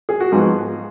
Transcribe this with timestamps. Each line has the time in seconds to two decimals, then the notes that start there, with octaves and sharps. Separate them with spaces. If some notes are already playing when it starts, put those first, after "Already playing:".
0.09 G#4
0.20 F#4
0.32 G#2 F3 B3 G#4